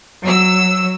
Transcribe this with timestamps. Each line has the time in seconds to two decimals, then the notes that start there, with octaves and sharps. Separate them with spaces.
0.23 F#3 E6